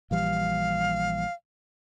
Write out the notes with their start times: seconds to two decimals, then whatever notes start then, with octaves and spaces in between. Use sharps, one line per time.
0.11 A#1 E3 G3 F5